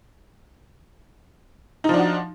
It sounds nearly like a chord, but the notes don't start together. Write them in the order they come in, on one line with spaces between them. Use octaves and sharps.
D#4 F3 D4 F#4